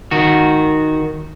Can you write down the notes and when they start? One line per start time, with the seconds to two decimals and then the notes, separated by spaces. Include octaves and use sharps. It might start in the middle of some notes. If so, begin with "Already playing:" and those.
0.11 D#3 F#4